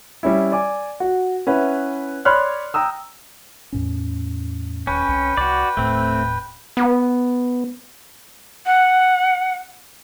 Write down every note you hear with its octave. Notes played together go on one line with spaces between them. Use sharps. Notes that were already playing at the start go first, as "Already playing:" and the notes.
G3 C#4 E4
D5 G#5 D6
F#4
C#4 E4 B4 F#5
C#5 D5 B5 C6 F6 F#6
G5 A#5 D#6 E6
E2 A2 C#4
D#1 C#4 B4 G5
C2
C2 F#4 D5
D#1 A2 A3 C4
B3
F#5